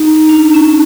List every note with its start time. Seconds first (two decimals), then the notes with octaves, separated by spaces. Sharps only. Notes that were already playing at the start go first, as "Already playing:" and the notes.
Already playing: D#4
0.29 D4
0.54 C#4